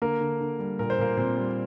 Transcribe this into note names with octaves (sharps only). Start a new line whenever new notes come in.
D3 A#3 A#4
D3
D3
G3
A#2 A#4
C5
A#2 A#3 A#4
A#2 C4
G3